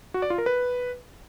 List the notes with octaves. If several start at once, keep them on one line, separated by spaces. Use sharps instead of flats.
F#4
D5
F4
A#4
B4